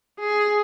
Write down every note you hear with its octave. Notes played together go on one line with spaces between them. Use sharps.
G#4